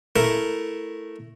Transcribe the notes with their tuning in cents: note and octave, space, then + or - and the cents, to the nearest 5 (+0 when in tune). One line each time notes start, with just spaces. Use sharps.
A3 +0 E4 +0 A#4 +0